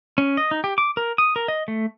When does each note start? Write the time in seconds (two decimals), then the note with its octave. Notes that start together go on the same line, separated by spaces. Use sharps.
0.18 C#4
0.37 D#5
0.51 D#4
0.64 G4
0.78 D6
0.97 A#4
1.18 D#6
1.36 A#4
1.48 D#5
1.68 A3